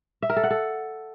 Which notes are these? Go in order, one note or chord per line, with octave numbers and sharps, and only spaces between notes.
E5
A#4
A4
F#5
A4